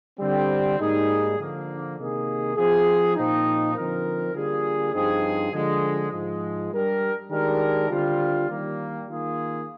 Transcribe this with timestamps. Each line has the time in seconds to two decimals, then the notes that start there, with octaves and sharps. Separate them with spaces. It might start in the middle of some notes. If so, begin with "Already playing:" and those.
0.20 D3 G3 C4
0.80 G#2 G3 A#3 D#4 G#4
1.38 D3 F3 A#3
1.97 C3 D#3 A#3 D#4 G#4
2.57 F3 C4 F4 G#4
3.15 A#2 F3 C4 D#4
3.75 D3 F3 C4 D#4 A#4
4.34 D3 G3 A#3 F4 G#4
4.93 G2 F3 C4 D#4 G#4
5.53 D3 F3 G#3
6.11 G#2 F3 G#3
6.71 G3 D4 G4 A#4
7.30 D#3 G#3 D4 G4 A#4
7.90 D3 G3 C4 F4
8.49 D#3 G3 A#3
9.07 D#3 A#3 F4 G#4